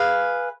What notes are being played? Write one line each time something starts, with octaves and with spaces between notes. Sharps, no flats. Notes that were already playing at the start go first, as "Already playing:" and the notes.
Already playing: G#4 B4 F5